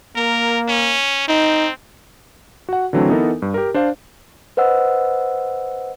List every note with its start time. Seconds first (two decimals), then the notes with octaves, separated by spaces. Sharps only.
0.16 A#3 A#4
0.68 C#4
1.28 C4 D#4
2.69 F#4 F#5
2.93 D3 E3 F#3 A3 C4 D4
3.09 E3 B3 D#4 A4 A#4
3.42 G2
3.54 G4 A#4
3.74 D4 C5 D5 F5
4.57 B4 C5 D#5 F#5 E6